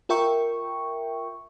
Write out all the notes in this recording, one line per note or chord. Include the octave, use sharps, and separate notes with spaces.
F4 A#4 E5 G5 C#6